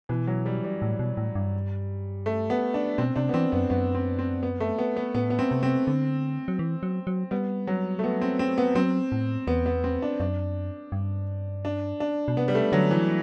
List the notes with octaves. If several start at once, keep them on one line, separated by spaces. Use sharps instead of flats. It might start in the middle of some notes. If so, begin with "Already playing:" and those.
B2 E3
F#3
G3
G3
A2
B2
A2
G2
A3
B3
D4
B2 C4
C3 D4
B3
E3 C4
F#2 B3
F#2 B3
C4
C4
B3
A3
B3
B3
A2 B3
B3
C4
C3
C4
D3
F#3
E3
F#3
F#3
G3 B3
F#3
A3
B3
C4
C4
B3
F#3 C4
A2
E2 B3
B3
C4
D4
F#2 D4
G2
D4
D4
B2
C3 B3
G3
A3
D3 F#3
E3